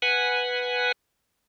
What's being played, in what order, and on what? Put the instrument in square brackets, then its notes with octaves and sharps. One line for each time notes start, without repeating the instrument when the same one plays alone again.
[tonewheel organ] B4 F#5 G#5